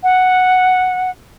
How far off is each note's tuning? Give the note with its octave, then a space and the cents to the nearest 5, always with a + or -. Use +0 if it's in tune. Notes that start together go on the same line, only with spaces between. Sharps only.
F#5 -5